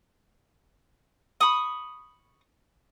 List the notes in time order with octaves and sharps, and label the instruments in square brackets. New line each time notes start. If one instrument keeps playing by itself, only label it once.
[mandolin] B5 C#6 D#6